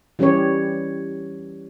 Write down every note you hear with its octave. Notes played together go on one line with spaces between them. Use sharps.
E3 G3 C#4 G4 C#5